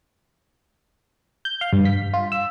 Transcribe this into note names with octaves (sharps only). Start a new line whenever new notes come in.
G6
F5
G2
B6
F4
E6